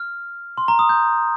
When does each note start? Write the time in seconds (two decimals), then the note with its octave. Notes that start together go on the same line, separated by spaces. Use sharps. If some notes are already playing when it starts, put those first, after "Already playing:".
Already playing: F6
0.58 C6
0.68 A#5
0.79 D#6
0.89 G6